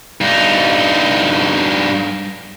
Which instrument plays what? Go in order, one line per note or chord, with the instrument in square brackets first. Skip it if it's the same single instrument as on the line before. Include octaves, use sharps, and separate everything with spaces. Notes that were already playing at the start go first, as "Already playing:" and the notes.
[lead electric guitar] G2 D#4